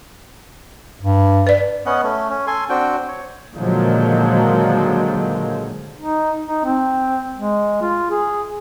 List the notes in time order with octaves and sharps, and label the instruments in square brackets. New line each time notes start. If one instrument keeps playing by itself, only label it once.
[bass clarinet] G2
[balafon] B4 D5
[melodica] B3 C#4 D#5 F#5
A3 C#4
C#4
A4 G#5 C6
C4 D4 F#4 G5
C#5
[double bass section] A#2 D3 D#3 F3 F#3 G#3
[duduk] D#4
D#4
C4
G#3
F4
G#4